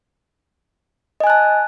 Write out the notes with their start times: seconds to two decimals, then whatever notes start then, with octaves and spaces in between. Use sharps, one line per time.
1.20 D#5
1.24 G#5
1.27 F#6
1.30 A5